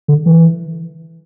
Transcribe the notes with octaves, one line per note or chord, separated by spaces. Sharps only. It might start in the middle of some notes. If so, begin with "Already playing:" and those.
D3
E3